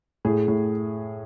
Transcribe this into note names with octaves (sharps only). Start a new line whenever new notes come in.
A2 G#4
A2